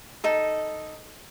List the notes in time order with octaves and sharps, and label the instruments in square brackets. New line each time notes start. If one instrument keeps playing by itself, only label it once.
[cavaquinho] D#4 A4